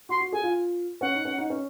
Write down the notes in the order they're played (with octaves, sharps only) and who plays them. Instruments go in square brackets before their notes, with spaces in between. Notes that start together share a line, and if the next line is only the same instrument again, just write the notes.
[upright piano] F#4 [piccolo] C6
[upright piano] F#4
[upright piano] G#4 [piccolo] G#5
[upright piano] F4
[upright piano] C#4 [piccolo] F#5
[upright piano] D#4
C#4
D#4
C#4